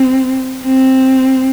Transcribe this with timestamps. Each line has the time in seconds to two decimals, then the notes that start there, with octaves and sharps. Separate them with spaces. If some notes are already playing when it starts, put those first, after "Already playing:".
Already playing: C4
0.64 C4